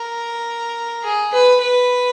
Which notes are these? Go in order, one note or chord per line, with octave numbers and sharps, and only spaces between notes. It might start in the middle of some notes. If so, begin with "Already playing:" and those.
Already playing: A#4
G#4
B4
B4